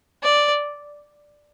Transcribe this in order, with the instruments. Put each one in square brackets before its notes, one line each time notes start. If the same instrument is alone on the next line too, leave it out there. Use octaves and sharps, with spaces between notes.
[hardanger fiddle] D5